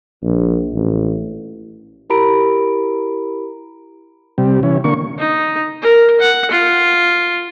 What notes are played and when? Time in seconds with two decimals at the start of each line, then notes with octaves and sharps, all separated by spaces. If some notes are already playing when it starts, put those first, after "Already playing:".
0.23 A#1
0.74 A1
2.10 E4 G4 A#4 A#5 B5 D7
4.38 C3 G3
4.63 E3 C#4
4.84 D3 A#3 C#6
5.19 D#4
5.82 A#4
6.21 F#5
6.51 F4